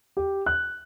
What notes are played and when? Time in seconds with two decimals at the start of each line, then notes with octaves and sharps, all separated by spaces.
0.17 G4
0.46 F#6